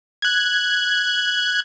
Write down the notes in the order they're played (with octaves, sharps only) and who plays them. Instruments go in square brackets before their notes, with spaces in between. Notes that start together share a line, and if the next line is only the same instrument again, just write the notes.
[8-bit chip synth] F#6 G#6